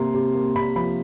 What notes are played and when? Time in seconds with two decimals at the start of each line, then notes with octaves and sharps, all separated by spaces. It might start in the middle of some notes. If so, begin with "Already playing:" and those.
Already playing: C3 A#3 C6
0.14 C3
0.34 A#3
0.55 C3 B5
0.76 F3 B5